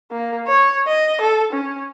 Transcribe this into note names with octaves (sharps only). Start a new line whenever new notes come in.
A#3
C#5
D#5
A4
C#4